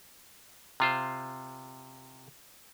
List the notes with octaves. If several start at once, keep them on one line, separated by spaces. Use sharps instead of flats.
C3 F4 C5